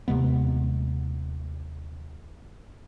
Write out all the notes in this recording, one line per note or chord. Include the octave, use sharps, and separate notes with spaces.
D#2 C3 G#3 B3